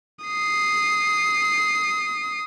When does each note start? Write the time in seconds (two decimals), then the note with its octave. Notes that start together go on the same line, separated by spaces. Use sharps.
0.25 D#6 C7